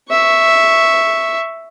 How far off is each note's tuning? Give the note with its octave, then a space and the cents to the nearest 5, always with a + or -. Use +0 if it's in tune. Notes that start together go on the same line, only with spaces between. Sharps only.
E5 +0 C#6 +0